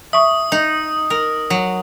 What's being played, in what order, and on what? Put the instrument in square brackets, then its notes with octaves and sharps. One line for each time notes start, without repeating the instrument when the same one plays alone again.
[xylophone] E5 C#6 [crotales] D#6
[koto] D#4
A#4
F#3